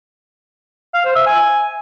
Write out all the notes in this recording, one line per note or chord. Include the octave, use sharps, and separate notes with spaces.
F5
C5
E5
G#5